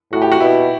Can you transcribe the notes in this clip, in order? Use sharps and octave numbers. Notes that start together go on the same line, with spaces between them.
A2 F#4
G4
F#4
B2 E4